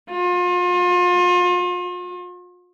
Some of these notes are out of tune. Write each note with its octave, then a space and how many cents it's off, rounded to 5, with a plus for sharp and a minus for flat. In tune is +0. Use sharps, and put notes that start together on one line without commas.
F4 +35